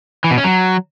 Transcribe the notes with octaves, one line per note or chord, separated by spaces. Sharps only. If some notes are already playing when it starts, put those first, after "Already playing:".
E3
B2
C#4
F#3